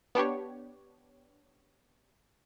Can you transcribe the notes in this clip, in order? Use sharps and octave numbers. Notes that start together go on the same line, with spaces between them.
B3 D4 G4 C#5